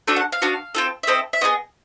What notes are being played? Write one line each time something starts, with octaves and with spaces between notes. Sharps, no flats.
A3 D4 F#4 A4 G#5
F#5
F5
B3 D4 F#4
C4 F4 A4
E5
C4 E4 A4 D#5
E5
B3 E4 G#4 D#5